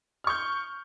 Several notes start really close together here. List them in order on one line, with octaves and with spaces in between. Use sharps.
F6 C#6 G6